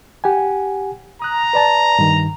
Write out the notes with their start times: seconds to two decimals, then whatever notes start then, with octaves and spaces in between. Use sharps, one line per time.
0.24 G4 F#5 G#5
1.22 A#5 D#6 F#6
1.53 B4 D5 A5
1.99 G2 D#3